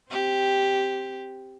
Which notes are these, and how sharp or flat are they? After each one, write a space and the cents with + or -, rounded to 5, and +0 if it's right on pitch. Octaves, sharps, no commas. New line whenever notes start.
C4 +0 G4 +0